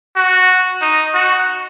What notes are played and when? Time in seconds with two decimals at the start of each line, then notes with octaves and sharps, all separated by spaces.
0.16 F#4
0.82 D#4
1.14 F#4